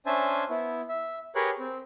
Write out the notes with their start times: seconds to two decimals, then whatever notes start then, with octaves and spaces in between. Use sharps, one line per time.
0.06 C#4 D4 C5 E5 G#5 A5
0.50 B3 E4
0.89 E5
1.35 G4 G#4 A#4 B4 C#5 F#6
1.59 C4